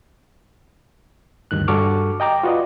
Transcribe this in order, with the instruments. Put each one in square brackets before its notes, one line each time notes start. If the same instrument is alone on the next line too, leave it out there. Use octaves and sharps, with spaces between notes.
[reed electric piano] D2 G2 D#3 F#6
G2 F#4 A4 C#6 D6 F6
D#5 G5 A#5 D6
F4 F#4 B4 D5 D#5